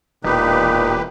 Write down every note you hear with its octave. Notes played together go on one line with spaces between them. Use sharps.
E1 A#2 D#4 G4 B4